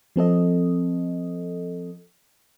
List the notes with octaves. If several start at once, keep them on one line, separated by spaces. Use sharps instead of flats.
F3 C4 A4 D#5